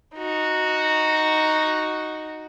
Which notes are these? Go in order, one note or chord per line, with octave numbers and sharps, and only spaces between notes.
D#4 F#4